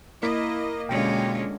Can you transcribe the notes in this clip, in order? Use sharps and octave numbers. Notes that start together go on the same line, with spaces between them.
A#3 E4 D#5 B6
B2 D3 G#3 A#3 C#4 F4 G5